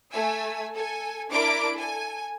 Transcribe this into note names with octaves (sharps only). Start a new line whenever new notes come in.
A3 G#5 E6
A4 G#5
D4 E4 A#4 D6 D7
A4 G#5